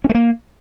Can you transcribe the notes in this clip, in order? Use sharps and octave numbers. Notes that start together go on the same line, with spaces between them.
C#4
A3
A#3